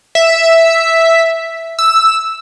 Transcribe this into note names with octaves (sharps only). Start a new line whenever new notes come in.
E5
E6